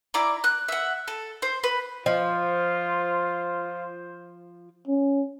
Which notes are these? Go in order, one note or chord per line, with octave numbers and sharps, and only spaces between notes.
E4 D5 A#5 D6
F#6
E5 F#5
A4
C5
B4
F3 F4 C5 D#5
C#4